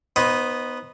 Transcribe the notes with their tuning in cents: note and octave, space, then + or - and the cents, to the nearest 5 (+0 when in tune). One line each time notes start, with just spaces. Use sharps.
B3 +0 D#4 +0 C5 +25